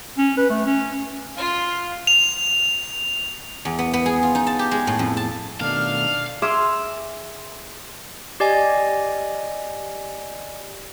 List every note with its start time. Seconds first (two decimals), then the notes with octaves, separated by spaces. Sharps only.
0.18 C#4
0.37 B4
0.50 A3
0.66 C#4
1.37 F4 F5
2.07 F7
3.65 E2
3.79 B3
3.93 B3
4.06 G#4
4.23 F4
4.35 D#4
4.47 A5
4.59 G4
4.71 G#3
4.87 A2
4.99 F2
5.17 A5
5.60 B2 D#3 A3 D4 F5 F6
6.42 G#4 E5 C6 D6 E6 F6
8.40 G4 D5 D#5 G#5